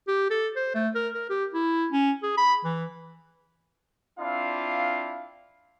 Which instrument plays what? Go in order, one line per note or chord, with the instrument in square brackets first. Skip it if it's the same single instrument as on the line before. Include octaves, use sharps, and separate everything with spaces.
[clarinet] G4
A4
C5
A3
A#4
A#4
G4
E4
C#4
G#4
B5
E3
[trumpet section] C4 D4 E4 F4 F5